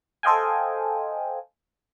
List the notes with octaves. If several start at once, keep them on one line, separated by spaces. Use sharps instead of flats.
A4 C5 D#5 F5 G5 G#5